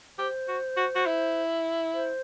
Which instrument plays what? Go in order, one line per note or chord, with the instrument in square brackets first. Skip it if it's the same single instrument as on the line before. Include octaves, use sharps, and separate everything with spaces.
[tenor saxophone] G4 [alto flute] C5
[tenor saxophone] F#4
F#4
F#4
E4
[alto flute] C5